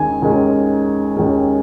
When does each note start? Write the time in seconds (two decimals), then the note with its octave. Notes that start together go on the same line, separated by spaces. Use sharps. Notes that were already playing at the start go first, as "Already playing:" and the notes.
Already playing: D#2 D#3 G#3 C#4 G#5
0.22 D#2 D#3 G#3 C#4
1.16 D#2 D#3 G#3 C#4